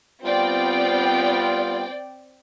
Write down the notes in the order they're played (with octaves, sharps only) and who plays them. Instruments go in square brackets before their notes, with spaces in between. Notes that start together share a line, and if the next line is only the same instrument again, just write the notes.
[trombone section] G3 B3 F4 [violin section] C4 D5 G5